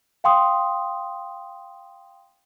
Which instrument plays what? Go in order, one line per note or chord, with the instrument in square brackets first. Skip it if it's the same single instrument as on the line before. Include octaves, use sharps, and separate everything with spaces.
[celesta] F5 G5 C6 D#6